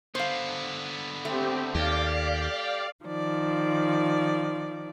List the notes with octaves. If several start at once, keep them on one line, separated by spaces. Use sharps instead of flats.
D3 B3 C5 F5
A3 C4 G4
D#2 G4 D5 F5
D#3 F3 D5